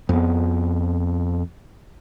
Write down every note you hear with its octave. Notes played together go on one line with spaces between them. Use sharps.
F2 B3